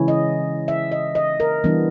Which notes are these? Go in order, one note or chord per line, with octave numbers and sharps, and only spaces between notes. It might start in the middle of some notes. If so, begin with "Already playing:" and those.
Already playing: C#3 E3 G#3 C#4 E4
D#5
E5
D#5
D#5
A#4
E3 G3 B3 D4